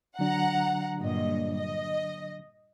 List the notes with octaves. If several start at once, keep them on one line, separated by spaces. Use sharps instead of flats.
D3 F#3 D4 F#5 A#5
G2 A#2 D#5
D#5